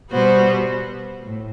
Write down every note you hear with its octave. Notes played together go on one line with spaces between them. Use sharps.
B2 G3 B3 F#4 C5
A2